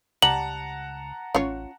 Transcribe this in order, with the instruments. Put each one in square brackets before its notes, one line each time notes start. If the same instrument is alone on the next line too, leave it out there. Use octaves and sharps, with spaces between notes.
[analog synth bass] C#2 [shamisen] G3 [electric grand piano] F#5 A5 A#5 [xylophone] F#7
[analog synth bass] A1 [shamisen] C#4 F4 C#5